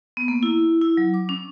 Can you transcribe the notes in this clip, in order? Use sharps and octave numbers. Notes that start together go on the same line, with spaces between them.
B3
A#3
E4
E4
F#3
D6
C#4